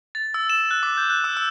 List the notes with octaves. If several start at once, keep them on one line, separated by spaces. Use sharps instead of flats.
A6
E6
E7
F#6
D6
G6
F#6
E6
E6